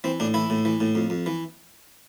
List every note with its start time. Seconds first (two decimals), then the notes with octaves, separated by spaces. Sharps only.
0.04 E3 C4
0.20 A2 D4
0.34 E3 E4
0.50 A2
0.65 E3
0.80 A2
0.95 F2
1.10 F2
1.26 E3